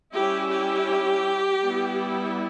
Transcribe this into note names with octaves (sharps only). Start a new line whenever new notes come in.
G3 C#4 E4 G4
G4
G3 B3 E4